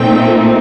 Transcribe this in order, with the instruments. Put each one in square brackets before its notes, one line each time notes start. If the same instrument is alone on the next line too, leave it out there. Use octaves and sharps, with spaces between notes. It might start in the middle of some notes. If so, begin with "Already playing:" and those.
Already playing: [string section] A#2 A3 C4 D#4 G5